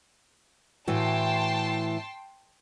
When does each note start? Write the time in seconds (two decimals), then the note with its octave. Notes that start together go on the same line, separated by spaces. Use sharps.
0.88 A2 E3 F#4 G5 A5 C6